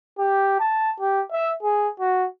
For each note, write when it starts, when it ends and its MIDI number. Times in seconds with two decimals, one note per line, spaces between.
0.19 0.57 67
0.60 0.92 81
1.00 1.22 67
1.32 1.51 76
1.63 1.89 68
2.00 2.26 66